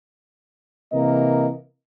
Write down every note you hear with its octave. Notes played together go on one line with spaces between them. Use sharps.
C3 E3 A#3 A#4 D#5